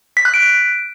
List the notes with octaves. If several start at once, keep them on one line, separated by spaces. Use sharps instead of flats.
B6
F#6
D7